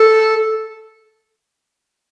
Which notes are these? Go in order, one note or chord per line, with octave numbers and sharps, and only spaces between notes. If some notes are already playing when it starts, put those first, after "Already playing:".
Already playing: A4